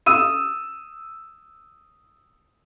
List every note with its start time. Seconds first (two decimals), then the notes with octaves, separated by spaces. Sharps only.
0.06 D#6 E6 D#7